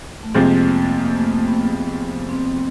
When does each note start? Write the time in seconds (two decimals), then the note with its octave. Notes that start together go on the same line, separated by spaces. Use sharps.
0.23 A3
0.34 F2 C3 F3 G#3 A#3 C4
0.67 B3
0.99 A#3
1.15 A3
1.32 A#3
1.48 B3
2.29 C4